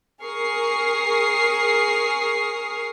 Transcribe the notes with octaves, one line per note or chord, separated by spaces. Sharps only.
G#4 A#4 C#6 D#6 F6 C7